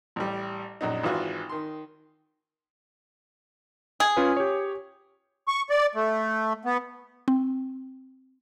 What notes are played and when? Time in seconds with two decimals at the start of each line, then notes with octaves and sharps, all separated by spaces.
0.16 A1 G3
0.81 A#1 F#2 D#4
1.03 G#1 E3 F4 F#4 F#6
1.49 D#3 C6
4.00 G#4
4.17 C#4 F4 B4
4.37 G4 C#5
5.48 C#6
5.70 D5
5.95 A3
6.65 B3
7.28 C4